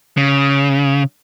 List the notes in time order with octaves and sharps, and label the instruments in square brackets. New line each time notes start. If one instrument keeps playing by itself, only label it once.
[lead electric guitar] C#3